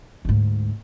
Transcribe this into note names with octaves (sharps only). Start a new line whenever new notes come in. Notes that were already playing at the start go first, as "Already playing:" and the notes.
D2 G#2